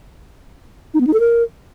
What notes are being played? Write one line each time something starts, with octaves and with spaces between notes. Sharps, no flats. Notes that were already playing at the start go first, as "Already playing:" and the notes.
D#4
B3
D#4
A4
A#4